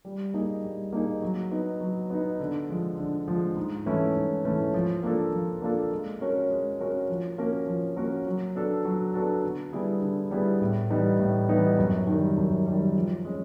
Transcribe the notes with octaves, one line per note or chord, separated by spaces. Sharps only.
G3
A#3 D#4 G#4
G3
A#3 D#4 G#4
F#3
B3 D#4
F#3
B3 D#4
D3
F3 G#3
D3
F3 G#3
G#2
E3 A3 C#4 E4
G#2
E3 A3 C#4 E4
F3
A#3 D4 F4 A4
F3
A#3 D4 F4 A4
G#3
C#4 F#4 A#4 C#5
G#3
C#4 F#4 A#4 C#5
F3
A#3 C#4 F#4 A#4
F3
A#3 C#4 F#4 A#4
F#3
B3 D4 F#4 A4
F#3
B3 D4 F#4 A4
D3
G3 B3 E4 G#4
D3
G3 B3 E4 G#4
A2
E3 G3 B3 D#4
A2
E3 G3 B3 D#4
F#2
D#3 G3
F#2
D#3 G3
F3
G#3 C#4